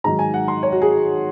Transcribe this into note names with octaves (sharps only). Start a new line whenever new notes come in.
G#2 D#3 F#3 A#5
G#5
F#5
C6
C#5
F#4
G#4